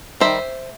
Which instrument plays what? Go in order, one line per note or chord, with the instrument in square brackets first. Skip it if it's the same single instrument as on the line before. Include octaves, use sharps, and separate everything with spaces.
[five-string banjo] D#3 G3 C4 C5 E5